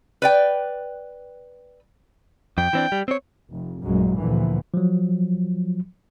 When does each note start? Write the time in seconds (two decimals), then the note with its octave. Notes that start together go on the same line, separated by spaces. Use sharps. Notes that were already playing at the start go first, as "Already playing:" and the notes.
0.22 B4 D5 G5
2.58 F2 G5
2.73 E3 C4 D4
2.92 G3
3.08 C4 C#5
3.50 F1
3.85 A1 F#2 A#2 F#3 G#3
4.18 D2 A#2 D3 E3 F3
4.74 F3 F#3